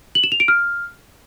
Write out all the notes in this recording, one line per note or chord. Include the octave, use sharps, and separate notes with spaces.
F#7
E7
F7
D7
F6